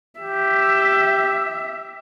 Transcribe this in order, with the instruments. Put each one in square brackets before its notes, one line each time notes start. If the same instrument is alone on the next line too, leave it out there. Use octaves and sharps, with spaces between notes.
[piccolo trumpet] G4 [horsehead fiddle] E5